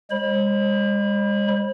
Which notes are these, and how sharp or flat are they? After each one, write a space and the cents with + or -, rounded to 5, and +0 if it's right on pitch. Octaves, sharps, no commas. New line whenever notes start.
G#3 -40 C5 +40 B5 -20